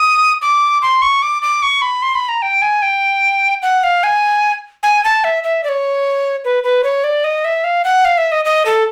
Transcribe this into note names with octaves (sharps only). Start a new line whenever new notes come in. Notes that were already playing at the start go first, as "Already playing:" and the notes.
Already playing: D#6
D6
C6
C#6
D6
D6
C#6
B5
C6
B5
A#5
G5
G#5
G5
F#5
F5
G#5
G#5
A5
E5
E5
D5
C#5
B4
B4
C#5
D5
D#5
E5
F5
F#5
F5
E5
D#5
D#5
A4